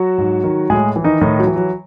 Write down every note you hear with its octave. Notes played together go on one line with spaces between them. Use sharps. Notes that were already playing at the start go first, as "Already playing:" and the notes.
Already playing: F#3 F#4
G#2
D#3
A2 G#3 G#4
E3
D#3 D#4
A2 D#3 D#4
F#3
E3
F#3